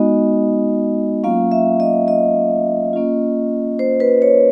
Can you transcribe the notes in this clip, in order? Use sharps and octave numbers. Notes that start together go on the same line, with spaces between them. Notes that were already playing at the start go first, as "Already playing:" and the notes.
Already playing: G#3 B3 D#4 F#4 D#5
F#3 A#3 C#4 F4 F5
E5
D#5
D#5
A#3 C#4 F4
C5
B4
C#5